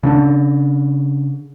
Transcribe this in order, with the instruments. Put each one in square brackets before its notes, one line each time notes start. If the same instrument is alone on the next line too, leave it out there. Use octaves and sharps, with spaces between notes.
[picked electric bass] C#3 C#4 D4